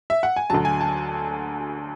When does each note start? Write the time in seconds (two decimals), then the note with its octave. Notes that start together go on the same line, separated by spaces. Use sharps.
0.10 E5
0.23 F#5
0.36 G#5
0.50 D2 D3 F#3 A5
0.65 G#5
0.81 A5